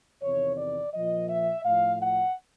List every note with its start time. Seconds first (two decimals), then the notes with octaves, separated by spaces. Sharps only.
0.22 E2 C3 D#3 C#5
0.58 D5
0.93 A#2 F3 D#5
1.29 E5
1.65 A2 F3 F5
2.00 F#5